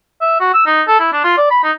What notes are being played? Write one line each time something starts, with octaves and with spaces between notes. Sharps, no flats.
E5
F#4
E6
D#4
A4
E4
D4
F4
D5
B5
D#4